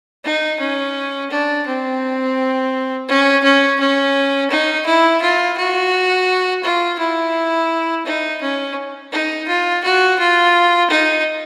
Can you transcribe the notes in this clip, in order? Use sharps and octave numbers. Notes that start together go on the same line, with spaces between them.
D#4
C#4
D4
C4
C#4
C#4
C#4
D#4
E4
F4
F#4
F4
E4
D#4
C#4
D#4
F4
F#4
F4
D#4